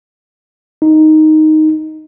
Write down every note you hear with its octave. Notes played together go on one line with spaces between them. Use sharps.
D#4